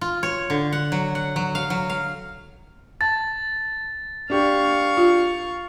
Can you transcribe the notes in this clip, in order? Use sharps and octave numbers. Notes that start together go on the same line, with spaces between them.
F4
C#5
D3
F#5
F#3
F#5
F#3
F5
F#3
F5
A5 A6
D4 G4 F5 C#6
F4